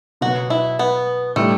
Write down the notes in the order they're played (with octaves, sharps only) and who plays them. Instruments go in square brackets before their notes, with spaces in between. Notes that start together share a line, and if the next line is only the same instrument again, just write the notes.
[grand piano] B2 F#3 B3 [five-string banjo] F#4
[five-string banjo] E4
B3
[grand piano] A2 G3 D4 [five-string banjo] A3